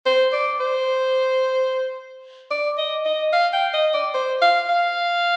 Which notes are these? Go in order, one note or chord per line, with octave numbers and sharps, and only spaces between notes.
C5
D5
C5
D5
D#5
D#5
F5
G5
D#5
D5
C5
F5
F5